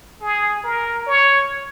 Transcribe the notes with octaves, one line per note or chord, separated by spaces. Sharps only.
G#4
A#4
C#5